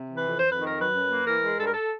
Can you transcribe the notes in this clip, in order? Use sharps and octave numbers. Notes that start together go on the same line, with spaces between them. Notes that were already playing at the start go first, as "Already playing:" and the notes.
Already playing: C3
E3
B4
F2
C5
F2
B4
D#3
A#4
F#3 B4
F#2
A#3
E3 A#4
G#3
G2 A4
A#4
A4